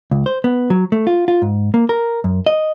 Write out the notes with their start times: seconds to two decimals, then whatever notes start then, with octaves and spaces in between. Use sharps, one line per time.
0.11 C#2
0.26 C5
0.44 B3
0.70 F#3
0.92 A3
1.07 F4
1.28 F4
1.42 G#2
1.74 A#3
1.89 A#4
2.24 F#2
2.46 D#5